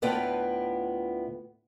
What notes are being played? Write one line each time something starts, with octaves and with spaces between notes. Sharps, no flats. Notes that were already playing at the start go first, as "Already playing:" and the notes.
D2 A2 B3 F4 B4 G5